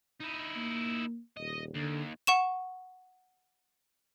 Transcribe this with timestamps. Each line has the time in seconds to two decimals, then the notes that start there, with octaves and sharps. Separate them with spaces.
0.21 D#4 E4
0.56 A#3
1.37 D#1 D#5
1.75 D#2 D3
2.27 F#5 C#6 E7